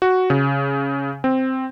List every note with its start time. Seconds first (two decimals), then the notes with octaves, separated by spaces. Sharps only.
0.02 F#4
0.30 C#3
1.24 C4